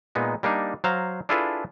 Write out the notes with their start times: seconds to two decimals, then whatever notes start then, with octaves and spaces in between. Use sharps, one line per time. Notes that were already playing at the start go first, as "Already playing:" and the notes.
0.15 A#2 G#3 B3 D#4
0.43 G3 A#3 D4 D#4
0.84 F#3 C5 F5 A#5
1.29 D4 E4 F4 G#4 A4 B4